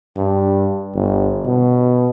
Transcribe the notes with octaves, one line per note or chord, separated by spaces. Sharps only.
G2
G1
B2